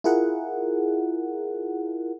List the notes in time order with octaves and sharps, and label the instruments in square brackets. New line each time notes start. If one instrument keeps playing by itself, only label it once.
[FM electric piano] E4 F4 G#4 A#4 F#5